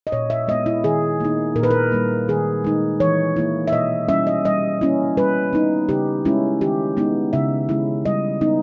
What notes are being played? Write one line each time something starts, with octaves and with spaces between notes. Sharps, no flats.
D#5
A#2 C#5
E5
G#3 B3 D#5
E4
D#3 G#4
A#3 D#4
A#2 A#4
B4
A#4
G3 A#3
D#3 G#4
G#3 D#4
E3 C#5
A#3 E4
E5
B2 D#5
G3 C#4 E5
D#5
G3 D#5
A#3 C#4 E4
G3 B4
B3 D#4
C#3 G4
G#3 C#4 E4
D#3 G4
G#3 B3 D#4
C#3 E5
G#3 C#4 E4
G3 D#5
B3 D#4